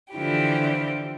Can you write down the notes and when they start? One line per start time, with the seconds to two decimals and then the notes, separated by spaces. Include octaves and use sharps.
0.12 D3 E3 F3 E4 G4